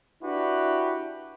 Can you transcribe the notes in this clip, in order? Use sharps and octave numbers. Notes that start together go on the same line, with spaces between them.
D4 E4 F#4 G4 B4